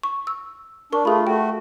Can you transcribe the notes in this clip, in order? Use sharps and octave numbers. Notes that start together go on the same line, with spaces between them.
C#6
E6
D4 A#4 C#6
A3 F4 G#4 B5
A3 F#4 G5